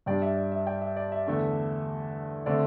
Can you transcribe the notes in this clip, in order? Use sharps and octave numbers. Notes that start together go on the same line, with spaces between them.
G2 G3 D4 D5 G5
E5
D5
E5
D5 G5
E5
D5
E5
E2 D3 A3 D4
D3 A3 C4 D5